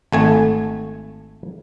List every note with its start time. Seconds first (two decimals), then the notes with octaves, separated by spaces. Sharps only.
0.12 G#1 A3 G#5